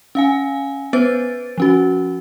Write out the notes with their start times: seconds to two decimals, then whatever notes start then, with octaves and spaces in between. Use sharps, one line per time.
0.15 C#4 F5 G#5
0.93 B3 B4 C5 A6
1.58 F3 C#4 F#4